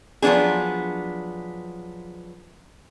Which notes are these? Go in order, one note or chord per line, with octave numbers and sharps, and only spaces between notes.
F3 F#3 B3 D4 G#4